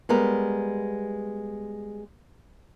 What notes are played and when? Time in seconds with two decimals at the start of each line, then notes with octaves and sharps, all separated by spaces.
0.09 G3 G#3 B3 A#4